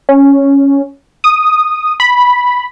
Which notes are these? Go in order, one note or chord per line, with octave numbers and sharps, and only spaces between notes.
C#4
D#6
B5